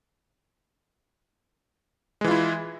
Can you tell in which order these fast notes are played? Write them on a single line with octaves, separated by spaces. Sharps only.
G#3 E3 F4 E4